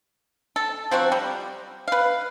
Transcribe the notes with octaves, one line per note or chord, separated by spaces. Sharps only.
A4
F3 F#3 C4 F#4
G3
B4 F5